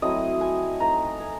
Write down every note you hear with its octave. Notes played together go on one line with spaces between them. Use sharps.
F#3 A3 C4 E4 D#5
G#5
A3 C4 D#4 A#5
G#5